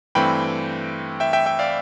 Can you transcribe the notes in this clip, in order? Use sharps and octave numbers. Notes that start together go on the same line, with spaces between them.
G2 E3 A3 C4 G5 B5
E5 G5
E5 G5
E5 G5
D5 F5